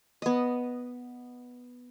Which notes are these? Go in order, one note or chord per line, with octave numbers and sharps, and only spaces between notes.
B3 D#5